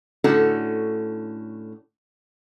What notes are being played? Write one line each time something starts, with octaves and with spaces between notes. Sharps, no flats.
A2 D3 C#4 F#4 A4